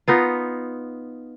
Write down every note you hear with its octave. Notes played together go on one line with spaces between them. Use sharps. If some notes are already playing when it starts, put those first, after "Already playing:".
B3 D#4 F4